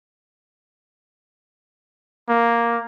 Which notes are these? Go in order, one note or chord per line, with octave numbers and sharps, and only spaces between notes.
A#3